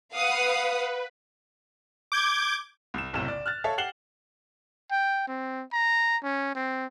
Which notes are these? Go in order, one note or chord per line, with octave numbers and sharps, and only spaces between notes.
B4 F5 F#5 D#6
D6 G6 G#6
C2 E7
F#1 B1 A2 C3 E7
D5
F6 F#6 A6
A4 C#5 E5 F5 A5
G4 F#5 C7 E7 F#7 G7
G5
C4
A#5
C#4
C4